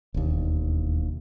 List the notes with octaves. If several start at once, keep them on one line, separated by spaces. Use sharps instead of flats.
E1 D#2